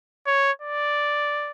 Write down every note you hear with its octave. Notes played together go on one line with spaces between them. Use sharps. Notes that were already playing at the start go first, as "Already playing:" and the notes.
C#5
D5